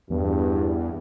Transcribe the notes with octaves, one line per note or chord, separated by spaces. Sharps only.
E2 G2